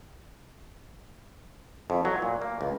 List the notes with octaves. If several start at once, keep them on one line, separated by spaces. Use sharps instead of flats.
F2
F#3
A#2
A#3
C#2